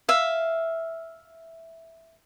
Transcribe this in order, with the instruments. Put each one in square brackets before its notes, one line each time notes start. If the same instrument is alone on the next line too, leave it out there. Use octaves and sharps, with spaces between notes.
[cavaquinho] E5 F5